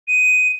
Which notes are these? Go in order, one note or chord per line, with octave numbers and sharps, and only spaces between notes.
D#7